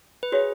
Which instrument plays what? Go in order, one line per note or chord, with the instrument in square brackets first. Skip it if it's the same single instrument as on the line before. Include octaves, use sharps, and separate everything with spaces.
[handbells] B4
[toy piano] F#4 C#5 E5 [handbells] G#4